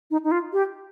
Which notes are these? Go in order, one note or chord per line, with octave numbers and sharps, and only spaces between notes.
D#4
D#4
F4
G4